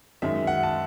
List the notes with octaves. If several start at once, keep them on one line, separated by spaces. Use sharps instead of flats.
F#2 D#3 G#3 E5
F#5
A5